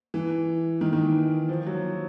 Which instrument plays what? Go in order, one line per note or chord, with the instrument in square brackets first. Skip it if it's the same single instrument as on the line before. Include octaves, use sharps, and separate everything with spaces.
[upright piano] E3
D#3
D#3
E3
F3
F#3